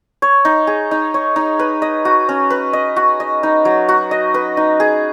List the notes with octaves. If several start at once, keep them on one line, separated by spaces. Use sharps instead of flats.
C#5
D#4
G#4
D#4
C#5
D#4
B4
D#5
F#4
C#4
B4
D#5
F#4
D#5
D#4
F#3
F#4
D#5
B4
D#4
G#4